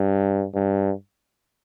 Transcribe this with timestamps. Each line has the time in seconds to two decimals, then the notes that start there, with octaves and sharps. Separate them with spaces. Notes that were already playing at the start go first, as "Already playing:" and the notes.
Already playing: G2
0.54 G2